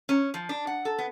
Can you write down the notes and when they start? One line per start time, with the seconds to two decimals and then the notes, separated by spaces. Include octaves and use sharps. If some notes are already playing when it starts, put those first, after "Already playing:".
0.09 C#4
0.34 F3
0.49 D4
0.67 F#5
0.85 A4
0.98 B3